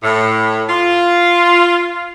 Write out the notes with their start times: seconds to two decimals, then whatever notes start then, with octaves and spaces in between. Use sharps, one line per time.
0.03 A2
0.69 F4